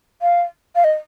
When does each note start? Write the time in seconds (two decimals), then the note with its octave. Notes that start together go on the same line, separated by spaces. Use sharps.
0.22 F5
0.76 F5
0.84 D#5